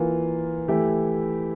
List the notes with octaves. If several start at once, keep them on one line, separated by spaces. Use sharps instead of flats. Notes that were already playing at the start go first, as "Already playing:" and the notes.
Already playing: E3 A#3 F4
E3 A3 E4 G4